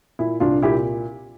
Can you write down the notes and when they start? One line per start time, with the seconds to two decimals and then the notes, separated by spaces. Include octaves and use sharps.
0.19 A#2 E4
0.40 C2 D4 F4
0.63 A#2 E4 G4